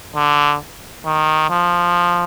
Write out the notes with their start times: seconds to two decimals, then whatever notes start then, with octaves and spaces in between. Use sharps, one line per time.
0.15 D3
1.06 D#3
1.50 F3